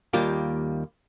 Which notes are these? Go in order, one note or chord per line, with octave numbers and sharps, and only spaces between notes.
D#2 G3 A#3 F4 G4